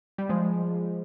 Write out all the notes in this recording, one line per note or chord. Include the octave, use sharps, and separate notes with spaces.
G3
F3 G#3